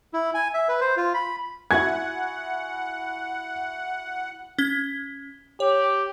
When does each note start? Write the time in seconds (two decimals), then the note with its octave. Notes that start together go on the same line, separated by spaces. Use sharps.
0.13 E4
0.34 G#5
0.54 E5
0.68 B4
0.81 C5
0.97 F4
1.14 B5
1.71 E4 F#4 F#5 G#5 G#6
4.58 C#4 G#6 G7
5.60 G4 C#5